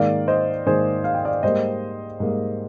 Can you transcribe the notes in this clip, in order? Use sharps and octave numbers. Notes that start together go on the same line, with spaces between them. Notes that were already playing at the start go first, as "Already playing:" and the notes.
Already playing: G#2 D#3 A#3 D5 F5
C5 D#5
G#2 D#3 A#3 G#4 C5
F5
G5
D5 F5
G#2 G3 A#3 C5 D#5
G#2 G3 A#3